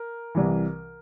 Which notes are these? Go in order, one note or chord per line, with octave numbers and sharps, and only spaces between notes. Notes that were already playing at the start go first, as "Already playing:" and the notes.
Already playing: A#4
C2 C3 E3